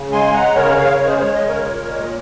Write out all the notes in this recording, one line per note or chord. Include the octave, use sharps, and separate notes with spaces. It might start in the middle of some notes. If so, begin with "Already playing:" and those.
Already playing: C#3
G#3 G#5 C6
G#3 F#5 A#5
C#3 A#4 C#5
C#3 C#5 F5
A#4 C#5
G#3
G#4 C5
G#3 C#5
D#5
C#3
A#4 C#5
A#2
G#3
D#5